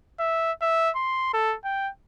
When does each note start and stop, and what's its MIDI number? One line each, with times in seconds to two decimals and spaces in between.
0.20 0.52 76
0.62 0.90 76
0.96 1.31 84
1.33 1.56 69
1.64 1.90 79